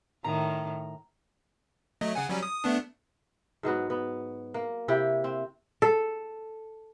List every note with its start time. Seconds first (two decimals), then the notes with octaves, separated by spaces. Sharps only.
0.24 A2 D#3 A#5
2.01 F#3 A3 D#5
2.15 C#3 F#5 G#5
2.30 F#3 G3 C#4
2.43 D#6
2.64 A3 B3 D4
3.63 G#2 F#3 B3 F#4
3.90 B3
4.54 A#3
4.88 C3 E4 G4 G5
5.24 C4
5.82 A4